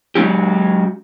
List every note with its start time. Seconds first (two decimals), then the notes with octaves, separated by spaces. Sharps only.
0.15 F#3 G#3 C#4 E4 G4